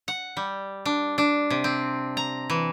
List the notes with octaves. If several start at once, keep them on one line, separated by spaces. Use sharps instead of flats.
F#5
G3
D4
D4
C3
C4
A#5
E3